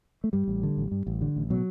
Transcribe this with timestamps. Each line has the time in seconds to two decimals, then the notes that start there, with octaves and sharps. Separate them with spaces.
0.24 A3
0.33 G2 G3
0.48 A1
0.63 D3
0.77 A1
0.92 G2
1.07 A1
1.21 D3
1.36 A1
1.50 B2 F#3